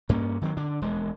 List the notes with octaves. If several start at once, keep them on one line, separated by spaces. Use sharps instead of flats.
G2 A#3 C#4
D#3 F#3 G#3 C4
D3 D4
E1 D#2 G#3